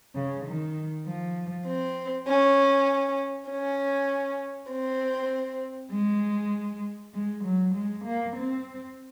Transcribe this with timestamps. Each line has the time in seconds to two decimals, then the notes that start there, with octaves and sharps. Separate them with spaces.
0.15 C#3
0.46 D#3
1.05 F3
1.66 C4
2.28 C#4
3.49 C#4
4.71 C4
5.91 G#3
7.13 G#3
7.43 F#3
7.74 G#3
8.04 A#3
8.35 C4